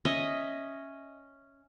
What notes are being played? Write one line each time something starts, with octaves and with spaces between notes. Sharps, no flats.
C#4 D#5 E5